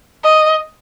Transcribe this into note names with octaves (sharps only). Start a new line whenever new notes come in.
D#5